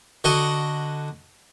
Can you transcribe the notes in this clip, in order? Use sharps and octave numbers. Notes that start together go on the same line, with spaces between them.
D3 F#4 D#5